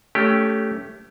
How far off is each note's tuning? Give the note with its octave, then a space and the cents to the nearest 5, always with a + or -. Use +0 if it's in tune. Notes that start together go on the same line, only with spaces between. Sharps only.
A3 +0 C#4 +15 G4 +0